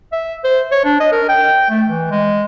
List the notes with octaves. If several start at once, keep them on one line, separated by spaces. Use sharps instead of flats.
E5
C5
C#5
D4
D#5
A#4
G5
A3
E3
G#3